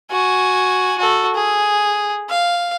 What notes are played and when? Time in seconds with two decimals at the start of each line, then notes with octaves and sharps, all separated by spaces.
0.12 F#4 G#5
0.98 F#4 A4
1.35 G#4
2.30 F5